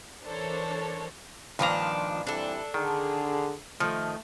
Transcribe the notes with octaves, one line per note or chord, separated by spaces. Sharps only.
E3 D4 A4 A#4 C5 C#5
G2 A#2 D#3 F3 D4 A#5
C3 E3 G3 D4 A4
D3 D#3 G#4
D#3 F3 A3